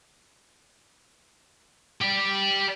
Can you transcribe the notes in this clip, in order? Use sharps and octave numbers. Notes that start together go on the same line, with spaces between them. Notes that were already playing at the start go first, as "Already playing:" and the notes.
G4 D5